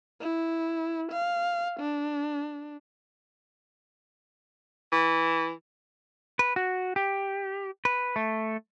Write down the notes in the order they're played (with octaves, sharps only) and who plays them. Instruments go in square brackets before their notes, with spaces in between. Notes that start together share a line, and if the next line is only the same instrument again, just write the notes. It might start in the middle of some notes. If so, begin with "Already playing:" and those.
[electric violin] E4
F5
D4
[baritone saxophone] E3
[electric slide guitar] B4
F#4
G4
B4
A3